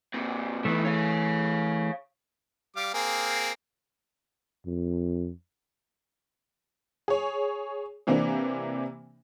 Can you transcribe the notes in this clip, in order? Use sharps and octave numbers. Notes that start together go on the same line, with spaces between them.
A#2 C4
D#3 E3 A3 B3
C#5 F5
G3 F5 D6
A#3 C4 G#4
F2
G#4 C#5
C3 E3 A#3 C4 D4